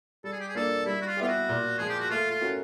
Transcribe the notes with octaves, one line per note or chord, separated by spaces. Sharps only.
G3 A4
G#4
G4
G#4
A#3 D4 F4 A4
G3 E4
F#4
F4
B3 E4 F4 G4
F#4
A#2
F3 G#3 G#4
G4
F#4
A3 F4
F4
C#4 F#4 A#4